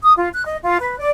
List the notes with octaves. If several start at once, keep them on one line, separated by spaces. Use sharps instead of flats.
D#6
F4
F#6
D#5
F4
B4
D5